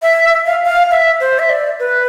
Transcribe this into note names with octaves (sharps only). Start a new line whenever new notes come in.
E5
F5
F5
E5
C5
E5
D5
B4